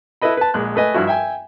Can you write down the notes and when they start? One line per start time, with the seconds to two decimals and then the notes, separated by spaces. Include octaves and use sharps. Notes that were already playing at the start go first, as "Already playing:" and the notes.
0.22 E4 A4 B4 D#5 B5
0.37 B4 A5
0.54 A#1 G#3 F#6
0.76 A3 B4 D#5 G#5
0.94 G2 F3 E4 F#4
1.07 E5 G5 G#5